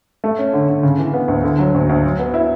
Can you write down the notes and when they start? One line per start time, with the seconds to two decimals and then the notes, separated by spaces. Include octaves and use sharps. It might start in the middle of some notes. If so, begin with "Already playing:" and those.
0.24 A3
0.39 C#4
0.53 D3
0.68 D3
0.83 C#3
0.98 E3
1.14 B3
1.28 D2
1.44 D3
1.59 F#3
1.74 D2
1.89 D2
2.04 F#3
2.19 B3
2.34 E4